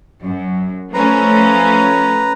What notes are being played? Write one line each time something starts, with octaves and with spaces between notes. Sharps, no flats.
F#2
F3 A3 C#4 B4 A#5